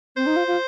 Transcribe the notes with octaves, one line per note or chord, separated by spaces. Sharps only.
C4 C5
D#4
F4
F4